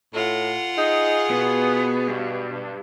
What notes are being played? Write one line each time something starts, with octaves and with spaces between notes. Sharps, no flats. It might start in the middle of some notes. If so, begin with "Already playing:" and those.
A2 F4 F#5
D#4 G#4 G#5
B2 B3
G2